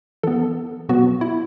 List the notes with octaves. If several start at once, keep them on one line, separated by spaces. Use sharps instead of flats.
E3 B3 A4
B2 F#3 B3 F#4
E4